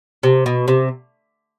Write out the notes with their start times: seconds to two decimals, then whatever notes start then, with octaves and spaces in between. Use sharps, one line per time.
0.23 C3
0.46 B2
0.68 C3